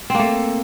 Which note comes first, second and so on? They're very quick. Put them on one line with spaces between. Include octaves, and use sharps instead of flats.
C4 A#3 A3